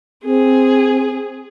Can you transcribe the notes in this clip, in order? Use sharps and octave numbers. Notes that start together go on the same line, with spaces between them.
C4 G#4